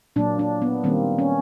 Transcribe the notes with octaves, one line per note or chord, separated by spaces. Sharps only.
A#2 F#3 A#3 D4
D4
B3
D#3 G3 A#3 C4
C#4